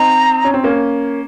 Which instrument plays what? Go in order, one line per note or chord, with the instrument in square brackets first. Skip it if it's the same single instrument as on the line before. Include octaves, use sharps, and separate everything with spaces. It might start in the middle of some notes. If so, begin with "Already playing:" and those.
Already playing: [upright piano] C4 D#4 [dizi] A#5
[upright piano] C#4
C4
A#3 C#4